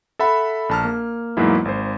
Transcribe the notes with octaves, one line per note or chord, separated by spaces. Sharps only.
A4 E5 F#5 B5
A#1 A5 F6
A#3
E2 G#2 F#3 A#3 B3 E4
G#1 C5